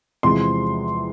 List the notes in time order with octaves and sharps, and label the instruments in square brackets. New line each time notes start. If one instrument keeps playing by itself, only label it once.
[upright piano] E2 C3 F3 G#3 C6